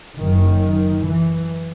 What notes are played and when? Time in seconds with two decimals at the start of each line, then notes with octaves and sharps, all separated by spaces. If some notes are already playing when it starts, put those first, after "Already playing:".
0.17 F#1 F#2 D#3
1.04 E3